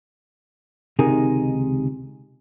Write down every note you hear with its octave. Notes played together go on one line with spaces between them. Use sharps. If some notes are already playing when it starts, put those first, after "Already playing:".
C#2 C3 D#3 D#4 G#4 A#4